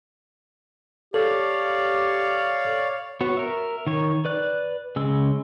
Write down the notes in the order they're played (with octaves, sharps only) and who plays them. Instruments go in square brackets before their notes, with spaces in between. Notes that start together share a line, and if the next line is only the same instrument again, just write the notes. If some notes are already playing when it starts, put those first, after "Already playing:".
[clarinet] G4 [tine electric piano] A4 [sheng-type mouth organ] C#5 D5 F5
[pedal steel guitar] B3 F#4 C#5
A#4 E5
D#3 C#5
B4 D5 F#6
C#3 G#3 E6